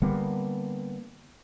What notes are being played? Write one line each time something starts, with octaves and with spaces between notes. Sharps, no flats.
D3 G3 A#3 B3